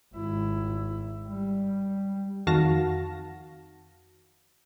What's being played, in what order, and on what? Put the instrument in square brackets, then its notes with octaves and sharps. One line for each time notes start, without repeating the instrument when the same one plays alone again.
[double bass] G#1 E4
G3
[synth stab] F2 D#3 F#4 F5 A5 A#6